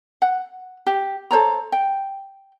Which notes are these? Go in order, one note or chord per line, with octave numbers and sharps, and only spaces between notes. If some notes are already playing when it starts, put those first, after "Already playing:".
F#5
G4
A4 C5 C#5 A#5
G5